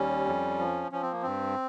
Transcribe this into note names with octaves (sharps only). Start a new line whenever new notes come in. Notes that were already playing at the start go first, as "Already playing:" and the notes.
Already playing: D#2 G3 C#4
F2
F3
F3 C#4
C4
A#3
G2 C4